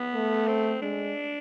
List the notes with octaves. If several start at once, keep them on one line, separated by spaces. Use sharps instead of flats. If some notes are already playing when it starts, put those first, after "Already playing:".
Already playing: B3
A3
C4
G#3 D4